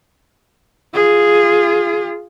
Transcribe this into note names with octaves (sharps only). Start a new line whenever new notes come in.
F4 G#4